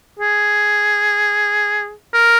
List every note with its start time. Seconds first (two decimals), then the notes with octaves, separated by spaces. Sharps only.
0.19 G#4
2.13 A#4